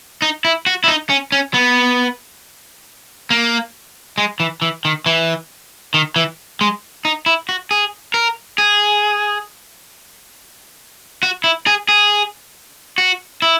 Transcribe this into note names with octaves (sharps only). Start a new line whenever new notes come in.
D#4
E4
F#4
E4
D#4
C#4
C#4
B3
A#3
G#3
E3
E3
D#3
E3
D#3
E3
G#3
D#4
E4
F#4
G#4
A#4
G#4
F#4
E4
G#4
G#4
F#4
E4